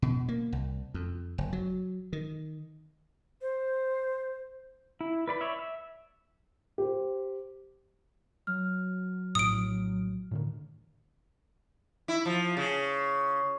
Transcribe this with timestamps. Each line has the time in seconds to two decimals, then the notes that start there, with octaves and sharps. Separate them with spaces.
0.02 B2
0.28 A#3
0.53 C2
0.94 F2
1.38 F#1
1.53 F#3
2.13 D#3
3.42 C5
5.01 E4
5.28 B4 D5 B5
5.41 C#5 D5 E5
5.59 E5
6.78 G4 C5
8.47 F#3 F6
9.35 A#1 A2 D#6 D7
10.31 A2 D3 D#3
12.08 E4
12.25 F3
12.57 C#3